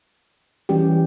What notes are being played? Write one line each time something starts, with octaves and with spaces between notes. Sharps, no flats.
E3 G3 C#4 G4